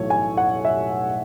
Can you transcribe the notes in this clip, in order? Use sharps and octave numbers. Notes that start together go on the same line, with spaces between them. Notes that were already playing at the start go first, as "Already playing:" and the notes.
Already playing: B1 A2 E3 A3 C#5
G#5
F#5
E5